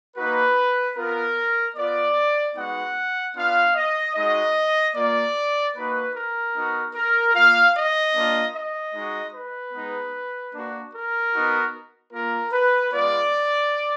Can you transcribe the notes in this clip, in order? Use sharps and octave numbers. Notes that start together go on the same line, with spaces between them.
A#3 D#4 F#4 B4
B3 F4 A#4
B3 F4 D5
G#3 B3 D#4 F#4 F#5
B3 D4 F4 F5
D#5
G#3 D#4 F#4 D#5
A#3 F4 D5
A#3 D#4 F#4 B4
A#4
B3 D#4 F#4
A#4
A#3 F4 F5
D#5
A#3 D4 F4
D#5
G#3 D#4 F#4
B4
G#3 B3 D#4
A#3 D4 F#4
A#4
B3 D#4 F#4
A#3 F4 A#4
B4
G#3 B3 F4 D5